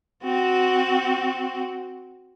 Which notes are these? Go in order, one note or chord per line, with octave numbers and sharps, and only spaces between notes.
C4 F#4